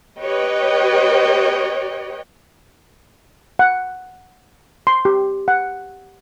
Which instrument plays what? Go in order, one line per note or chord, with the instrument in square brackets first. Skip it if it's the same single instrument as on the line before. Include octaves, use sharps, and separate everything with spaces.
[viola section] G4 B4 C#5 D#5 G5
[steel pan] F#5
C6
G4
F#5